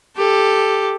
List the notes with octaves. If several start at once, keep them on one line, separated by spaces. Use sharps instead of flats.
G4 A4